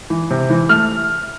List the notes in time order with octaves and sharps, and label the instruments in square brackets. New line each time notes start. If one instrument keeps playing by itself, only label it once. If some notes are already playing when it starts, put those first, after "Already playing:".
[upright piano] E3
C3
E3
A3 F6